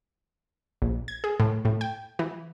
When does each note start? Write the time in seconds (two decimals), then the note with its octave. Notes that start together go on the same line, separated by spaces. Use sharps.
0.82 A#1
1.08 G#6
1.24 G#4
1.40 A2
1.65 A2
1.81 G5
2.19 E3